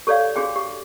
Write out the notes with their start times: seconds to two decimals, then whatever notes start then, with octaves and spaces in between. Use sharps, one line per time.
0.07 G4 A4 C#5 D5 F5
0.36 D4 F#4 G#4 G5
0.56 G4